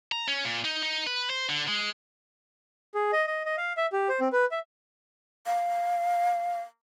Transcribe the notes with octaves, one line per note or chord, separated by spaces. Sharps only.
A#5
C#4
A#2
D#4
D#4
B4
C5
D3
G#3
G#4
D#5
D#5
D#5
F5
E5
G4
C5
C4
B4
E5
F5